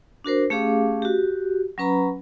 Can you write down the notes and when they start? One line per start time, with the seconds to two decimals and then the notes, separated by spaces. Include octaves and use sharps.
0.24 D4 F#4 A#4 C5
0.50 A3 C#4 G4 G#4 F5 D6
1.02 F#4 G4
1.78 F#3 C#4 B4 A#5 B5